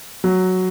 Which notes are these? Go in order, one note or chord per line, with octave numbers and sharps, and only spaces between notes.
F#3